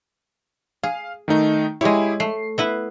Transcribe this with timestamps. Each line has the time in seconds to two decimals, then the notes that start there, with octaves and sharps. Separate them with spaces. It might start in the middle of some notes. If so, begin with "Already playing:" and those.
0.83 G#4 F5
1.28 D#3 A3 D#4
1.81 G#3 E4 G4 G#4 C#5
2.20 A3 C7
2.58 B3 E4 B4